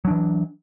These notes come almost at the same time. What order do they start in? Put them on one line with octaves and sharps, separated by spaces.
F#3 D4 E3